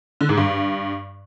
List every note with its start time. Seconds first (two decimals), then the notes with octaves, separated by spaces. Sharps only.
0.21 D3
0.29 G#2
0.37 G2